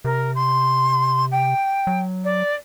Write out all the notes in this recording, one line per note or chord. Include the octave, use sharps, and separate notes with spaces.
C3 A#4
C6
G5
F#3
D5